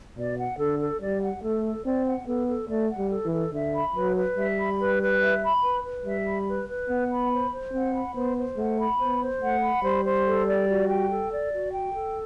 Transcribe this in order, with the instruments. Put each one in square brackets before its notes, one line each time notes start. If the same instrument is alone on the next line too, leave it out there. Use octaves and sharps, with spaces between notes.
[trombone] B2 [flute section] D5
[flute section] F#5
[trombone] D3 [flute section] A4
[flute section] A4
[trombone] G3 [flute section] D5
[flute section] F#5
[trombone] A3 [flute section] A4
[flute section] A4
[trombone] C4 [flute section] D5
[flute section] F#5
[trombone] B3 [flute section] A4
[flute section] A4
[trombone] A3 [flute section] D5
[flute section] F#5
[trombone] G3
[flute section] A4
[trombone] E3
[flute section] A4
[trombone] D3 [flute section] E5
[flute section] B5
[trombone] F#3 [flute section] B4
[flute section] B4
[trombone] G3 [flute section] E5
[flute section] B5
B4
B4
E5
B5
B4
B4
[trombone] G3 [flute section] E5
[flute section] B5
B4
B4
[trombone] B3 [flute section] F#5
[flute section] B5
C5
C5
[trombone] C4 [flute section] F#5
[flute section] B5
[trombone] B3 [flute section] C5
[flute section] C5
[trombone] A3 [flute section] F#5
[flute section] B5
[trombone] B3 [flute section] C5
[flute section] C5
[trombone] A3 [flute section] F#5
[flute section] B5
[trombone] G3 [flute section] C5
[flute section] C5
A4
D5
F#4
G5
A4
D5
F#4
G5
A4